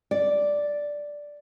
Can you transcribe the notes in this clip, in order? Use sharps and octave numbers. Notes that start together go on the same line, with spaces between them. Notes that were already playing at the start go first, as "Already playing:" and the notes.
D5